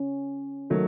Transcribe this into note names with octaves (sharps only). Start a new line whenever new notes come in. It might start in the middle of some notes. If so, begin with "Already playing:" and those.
Already playing: C#4
D#3 F#3 A3